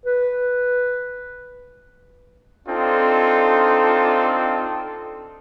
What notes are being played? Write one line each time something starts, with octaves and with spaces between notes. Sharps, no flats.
B4
C4 D4 D#4 F4 A4